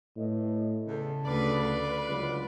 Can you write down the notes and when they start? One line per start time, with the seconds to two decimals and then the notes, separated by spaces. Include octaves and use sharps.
0.17 A2 B4 D#5
0.87 E2 C#3 A4
1.26 D2 F4 B4 D5
1.62 B4
2.08 C#2 D3 F#3